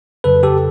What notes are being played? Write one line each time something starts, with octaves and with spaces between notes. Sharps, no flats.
F2 C#3 F#3 A4 B4
G4 A4